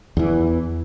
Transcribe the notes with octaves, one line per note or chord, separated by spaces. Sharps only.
E2 E3